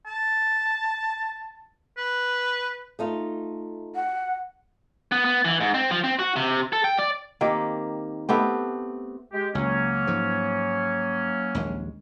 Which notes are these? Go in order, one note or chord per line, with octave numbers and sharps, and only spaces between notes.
A5
B4
A3 D#4 F4
F#5
B3
B3
E3
G#2
C4
F3
C4
F#4
C3
A4
G5
D5
D#3 A#3 C4 G4
A3 B3 C4 G4
G#3 G4
C#2 F#3 A#3 C#4
G#2 F3
A#1 D#2 G#3